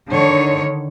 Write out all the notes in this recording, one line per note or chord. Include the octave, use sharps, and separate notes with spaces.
D3 D#3 C#5